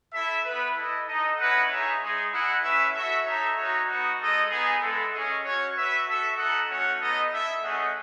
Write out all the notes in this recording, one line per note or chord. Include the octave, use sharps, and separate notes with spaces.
E4 A4 E5
B3 E4 B4
E4 A4 D#5
D#4 A4 D#5
C#4 E4 B4 D#5 F#5
D#4 G#4 C#5 E5
G#3 D#4 G#4
E4 G#4 D#5 F#5
C#4 E4 B4 E5
F#4 A4 E5
D#4 A4 C#5 E5
D#4 F#4 C#5
B3 D#4 F#4
G#3 D#4 A4 D#5
B3 D#4 G#4
G#3 B3 E4 A4
C#4 G#4 D#5
C#4 F#4 C#5
F#4 B4 E5
F#4 A4 E5
D#4 A4 D#5 F#5
A3 C#4 F#4 C#5 F#5
B3 D#4 A4 D#5
E4 A4 E5
A3 C#4 G#4 D#5 F#5